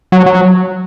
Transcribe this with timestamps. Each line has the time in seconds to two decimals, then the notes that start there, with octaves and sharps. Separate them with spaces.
0.12 F#3
0.26 F#3